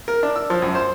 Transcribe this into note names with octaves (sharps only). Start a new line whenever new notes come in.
A#4
D4
E6
F3
F#2
C5